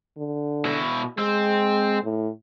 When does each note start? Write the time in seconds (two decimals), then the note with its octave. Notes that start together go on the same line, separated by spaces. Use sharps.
0.18 D3
0.65 B2 E4
1.18 G#3 C4
2.04 A2